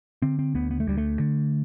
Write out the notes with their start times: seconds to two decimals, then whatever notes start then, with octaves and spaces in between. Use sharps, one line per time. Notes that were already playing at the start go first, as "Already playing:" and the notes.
0.22 D3 C4
0.39 C4
0.55 D2 B3
0.71 B3
0.80 A3
0.87 D2 G3
0.98 A3
1.19 D3